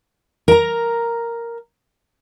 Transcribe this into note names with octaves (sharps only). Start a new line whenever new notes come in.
A#4 A#5